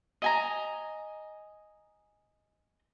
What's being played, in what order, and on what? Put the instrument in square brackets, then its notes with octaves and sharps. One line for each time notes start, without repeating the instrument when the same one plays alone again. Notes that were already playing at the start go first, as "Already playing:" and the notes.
[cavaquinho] D#5 G#5 A#5